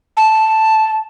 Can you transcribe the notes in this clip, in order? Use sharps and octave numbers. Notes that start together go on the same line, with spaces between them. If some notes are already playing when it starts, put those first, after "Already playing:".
A5